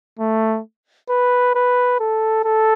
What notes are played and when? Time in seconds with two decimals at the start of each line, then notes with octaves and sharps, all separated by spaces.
0.19 A3
1.09 B4
1.55 B4
2.00 A4
2.45 A4